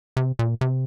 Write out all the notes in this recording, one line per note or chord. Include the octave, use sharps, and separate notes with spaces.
C3
A#2
C3